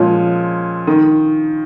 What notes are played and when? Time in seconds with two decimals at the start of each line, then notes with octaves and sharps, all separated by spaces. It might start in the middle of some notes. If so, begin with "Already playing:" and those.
Already playing: A#2 F3 G#3 C#4
0.87 D#3